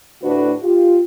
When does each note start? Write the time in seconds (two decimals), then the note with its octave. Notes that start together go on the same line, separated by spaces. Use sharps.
0.23 D2 A2 D4 F#4 B4
0.63 F4 G4